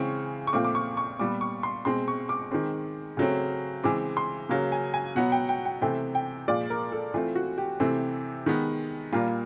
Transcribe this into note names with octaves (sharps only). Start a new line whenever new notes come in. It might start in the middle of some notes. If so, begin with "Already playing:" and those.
Already playing: C#3 E3 G#3 C4 C#6
C#6
A#2 F3 A3 C4 D6
D6
C#6
C#6
A#2 G3 B3 D6
C#6
C6
B2 G#3 C4 C6
C#6
D6
D#3 G#3 C4
C#3 F#3 A3 C4
C#3 E3 G#3 C4 D6
C6
C#3 F#3 A#3
G#5
G#5
B2 F#3 B3 F#5
G5
G5
G5
C3 E3 A3 C4 G5
G5
A#2 F3 G#3 D5
A#4
A4
E3 A3 C4 F4
F#4
G4
C3 E3 A3 C4
D#3 G#3 B3
A#2 G3 A#3 F4